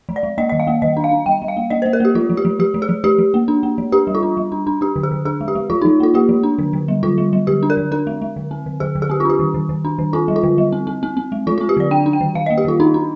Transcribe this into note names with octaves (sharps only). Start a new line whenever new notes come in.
F3
D5
G#3
A#3 D#5
D#3 D#5
F5
A#3
D#3 D#5
D4
F5
D4
G3 G5
G3
F5
A#3
A#3 D#5
C5
A#3
A#4
A#3 G4
F3 F4
F3
G4
F3
F3 G4
F3
G#4
F3
F3 G4
F3
A#3
D4
A#3
F3
D4 G4
G3
F4
D4
G3
D4
D4
D4 G4
D3
G#4
D3
D4 G#4
G#3
G4
G#3
F3 F4
D#4
F3
A#3 F4
A#3 G4
F3
D4
D3
D3
G3
D3 F4
G3
G3
D3 G4
D4
A#4
D3
D4 A#4
G#3
G#3
D3
C4
D3
D3 G#4
D3
G#4
C4 G4
F4
D4 G4
D#3
D#3
D#3
D4
D#3
C4 F4
G3
F4
D3
G3
C4
C4
C4
C4
G#3
F3 F4
F4
C4
G4
D3 D5
D4 G5
D4
G5
D#3
D#3 F5
D#5
A#3
G4
D#3 F4
D4 D#4
D4